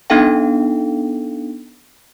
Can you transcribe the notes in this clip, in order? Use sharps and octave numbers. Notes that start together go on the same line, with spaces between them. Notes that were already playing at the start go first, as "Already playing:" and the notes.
B3 D4 D#4 A4 F5 G5